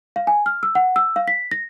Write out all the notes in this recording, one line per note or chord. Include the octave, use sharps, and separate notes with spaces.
F5
G#5
F6
E6
F#5
E6
F5
B6
A#6